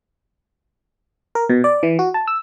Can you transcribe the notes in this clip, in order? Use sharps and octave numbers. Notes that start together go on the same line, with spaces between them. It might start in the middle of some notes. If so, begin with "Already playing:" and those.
A#4
B2
D5
E3
F#4
A5
E6